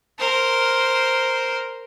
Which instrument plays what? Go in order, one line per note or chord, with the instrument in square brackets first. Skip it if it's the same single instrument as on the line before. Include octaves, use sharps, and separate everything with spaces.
[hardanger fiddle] A#4 C5